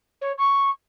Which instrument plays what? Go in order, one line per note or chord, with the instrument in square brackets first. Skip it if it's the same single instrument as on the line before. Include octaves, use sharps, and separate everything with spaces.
[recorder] C#5
C#6